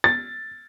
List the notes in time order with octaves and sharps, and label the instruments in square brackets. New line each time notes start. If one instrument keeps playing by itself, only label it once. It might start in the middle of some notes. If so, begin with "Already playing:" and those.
[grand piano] A6